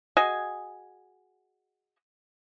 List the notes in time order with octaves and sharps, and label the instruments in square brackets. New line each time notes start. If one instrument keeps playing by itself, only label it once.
[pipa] F#4 G#4 D#5 G#5